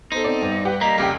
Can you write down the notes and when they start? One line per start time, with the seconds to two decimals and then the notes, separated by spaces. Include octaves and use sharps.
0.12 B3 D#4 A4 C5
0.24 C4 D5
0.42 G2
0.65 G4 B4 F#5
0.81 G3 A#3 D#4 A#5 B6
0.98 F1 C#2 E4 G4 A#4 G5